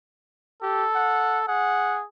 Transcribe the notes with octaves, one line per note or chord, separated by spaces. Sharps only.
G4 A4
F#5
G#4 F#5